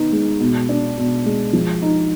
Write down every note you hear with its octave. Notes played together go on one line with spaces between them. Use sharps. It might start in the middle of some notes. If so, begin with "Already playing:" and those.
Already playing: D#3 B3 D#4
G#3
B2
D4
B2
G#3
F3
D#4